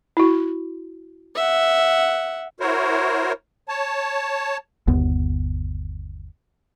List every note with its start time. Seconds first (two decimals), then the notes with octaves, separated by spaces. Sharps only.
0.17 E4 F#4
1.35 E5 F#5
2.60 E4 F#4 A#4 C5 C#5
3.68 C#5 A5
4.88 G1 D#2 B3